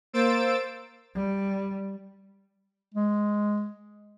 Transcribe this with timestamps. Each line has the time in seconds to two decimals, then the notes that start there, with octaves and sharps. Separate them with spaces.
0.13 A#3 C5 E6 A6 D7
1.15 G3
2.94 G#3